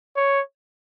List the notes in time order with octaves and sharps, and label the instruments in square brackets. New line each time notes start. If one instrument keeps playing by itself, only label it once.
[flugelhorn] C#5